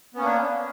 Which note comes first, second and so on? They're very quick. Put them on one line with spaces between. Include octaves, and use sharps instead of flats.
B3 C#4 A#3 D4